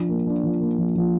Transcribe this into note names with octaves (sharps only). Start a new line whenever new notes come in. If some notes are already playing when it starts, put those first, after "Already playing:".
Already playing: F3 D4
A#3
D4
F3
A#3
F3
F3